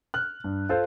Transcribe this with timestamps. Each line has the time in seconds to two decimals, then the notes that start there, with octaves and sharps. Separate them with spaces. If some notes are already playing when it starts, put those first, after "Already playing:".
0.14 F6 F#6
0.44 G2
0.69 F4 A4 C5